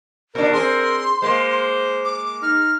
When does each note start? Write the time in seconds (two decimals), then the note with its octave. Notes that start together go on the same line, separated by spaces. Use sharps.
0.35 A#2 D4 A#4
0.53 C4 G#4 C6
1.22 G#3 A#3 C5
2.05 D6
2.42 D#4 F6